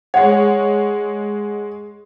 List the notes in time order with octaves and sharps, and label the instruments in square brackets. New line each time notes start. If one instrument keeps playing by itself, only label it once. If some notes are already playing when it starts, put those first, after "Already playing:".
[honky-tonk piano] G#3 C#5 [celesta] F#5